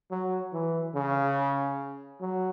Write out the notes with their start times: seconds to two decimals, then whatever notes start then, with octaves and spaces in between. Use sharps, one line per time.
0.11 F#3
0.53 E3
0.95 C#3
2.21 F#3